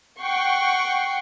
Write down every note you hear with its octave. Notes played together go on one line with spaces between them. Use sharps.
F#5 G5 C#6 C7